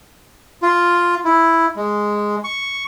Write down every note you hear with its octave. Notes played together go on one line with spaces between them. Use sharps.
F4
E4
G#3
C#6